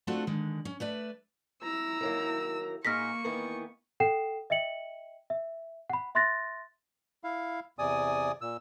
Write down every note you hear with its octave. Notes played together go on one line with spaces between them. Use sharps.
A3 C4 D4 F4 F#4 A4
D3 D#3 G#3
C#4
A3 B4 D5 E5
E4 A#5 E6
D#3 F#3 A#3
G#2 G#3 A#3 D#4 C#6 F6 A#6 B6
D#3 E3 B3
A4 F#5 G5 C7 E7
D#5 E5 G5 C#7 F#7
E5
F#5 B5
E5 C6 F#6 A6 A#6
E4 F5
E2 C3 D5 G#5 D#6
A#2 E6